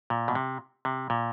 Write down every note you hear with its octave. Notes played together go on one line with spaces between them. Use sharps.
A#2
B2
C3
C3
A#2